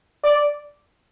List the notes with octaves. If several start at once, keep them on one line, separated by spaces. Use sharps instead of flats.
D5